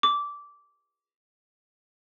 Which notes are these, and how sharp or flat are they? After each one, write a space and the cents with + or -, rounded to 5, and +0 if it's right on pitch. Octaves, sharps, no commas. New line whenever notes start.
D6 -15